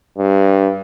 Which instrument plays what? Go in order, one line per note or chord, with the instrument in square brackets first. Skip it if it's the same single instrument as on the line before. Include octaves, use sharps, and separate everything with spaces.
[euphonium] G2